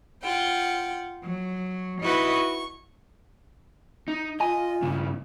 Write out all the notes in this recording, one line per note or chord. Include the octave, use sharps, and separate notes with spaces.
F4 F#5 G5
F#3
D#4 E4 F#4 B4 D#5 C#6
C#6
D#4
F4 D#5 G#5
G2 C#3